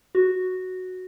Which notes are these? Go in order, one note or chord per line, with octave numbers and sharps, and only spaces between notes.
F#4